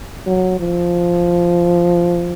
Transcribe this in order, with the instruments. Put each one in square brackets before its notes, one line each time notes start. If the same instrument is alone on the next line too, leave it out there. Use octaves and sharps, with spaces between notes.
[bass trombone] F#3
F3